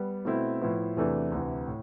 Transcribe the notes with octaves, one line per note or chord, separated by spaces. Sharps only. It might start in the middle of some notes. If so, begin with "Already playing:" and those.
Already playing: G3 B3
B2 A3 C4 E4
A2 F3 B3 E4
E2 C3 E3 A3 D4
D2 C3 E3
A2